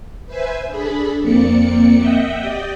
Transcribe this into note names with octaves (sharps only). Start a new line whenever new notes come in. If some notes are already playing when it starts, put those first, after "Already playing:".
B4 C5 E5 G#5
D4 G#4 A4 B5
F2 A#3 C4 D5 C#7
D#5 E5 F#5 G5
G4 D5 D#5 G5